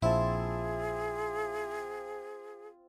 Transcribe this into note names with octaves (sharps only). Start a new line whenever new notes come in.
A#1 C4 E4 F4 G#4 A5